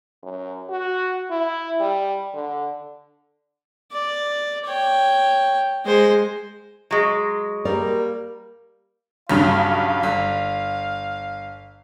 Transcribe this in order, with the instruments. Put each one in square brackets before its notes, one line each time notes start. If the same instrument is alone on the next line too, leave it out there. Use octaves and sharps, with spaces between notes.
[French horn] F#2
F#4
E4
G3
D3
[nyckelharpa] D5
C#5 G5
G#3 C5
[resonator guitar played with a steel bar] F#3 G#3
[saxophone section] G3 A#3 [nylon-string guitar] A#4 D5
[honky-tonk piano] B1 G2 C#3 [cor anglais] F5
[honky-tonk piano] G1